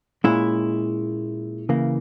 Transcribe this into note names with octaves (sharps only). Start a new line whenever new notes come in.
A#2 G#3 C#4 E4
C#3 E3 A#3